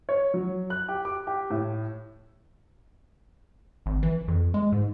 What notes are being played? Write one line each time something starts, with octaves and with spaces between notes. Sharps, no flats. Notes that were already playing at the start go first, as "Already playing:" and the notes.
C#5
F#3
F#6
G4
D6
G4
A2
G#1
E3
F2
G#3
G#2